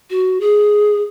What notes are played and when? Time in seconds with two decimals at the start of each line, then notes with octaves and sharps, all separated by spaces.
0.10 F#4
0.41 G#4